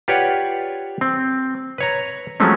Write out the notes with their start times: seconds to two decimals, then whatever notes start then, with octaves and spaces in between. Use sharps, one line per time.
0.08 F4 G4 B4 C#5 D5 F#5
1.01 C4
1.78 B4 C#5 A#5
2.40 F3 F#3 G#3 A3 C4 C#4